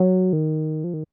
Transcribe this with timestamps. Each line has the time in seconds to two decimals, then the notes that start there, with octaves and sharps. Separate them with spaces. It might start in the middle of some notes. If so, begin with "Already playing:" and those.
Already playing: F#3
0.33 D#3
0.84 F3
0.93 D#3